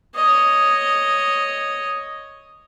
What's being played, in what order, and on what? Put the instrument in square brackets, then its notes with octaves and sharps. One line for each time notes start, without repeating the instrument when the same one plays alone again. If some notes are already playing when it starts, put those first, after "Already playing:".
[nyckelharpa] C#5 D#5